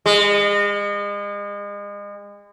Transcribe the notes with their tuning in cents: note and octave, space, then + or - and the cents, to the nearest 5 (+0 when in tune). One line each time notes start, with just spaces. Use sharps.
G#3 -35